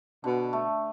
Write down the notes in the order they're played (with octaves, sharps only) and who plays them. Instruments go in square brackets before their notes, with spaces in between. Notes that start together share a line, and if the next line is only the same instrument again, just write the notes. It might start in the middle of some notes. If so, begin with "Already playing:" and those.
[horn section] B2 [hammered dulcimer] D3
[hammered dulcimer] A3